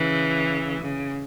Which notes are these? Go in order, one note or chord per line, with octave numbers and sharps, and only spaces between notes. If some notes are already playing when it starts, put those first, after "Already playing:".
Already playing: C#3 E3
C#3